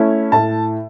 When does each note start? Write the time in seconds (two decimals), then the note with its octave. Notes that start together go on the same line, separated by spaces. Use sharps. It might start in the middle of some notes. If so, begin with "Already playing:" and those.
Already playing: A3 C#4 E4
0.32 A2 A5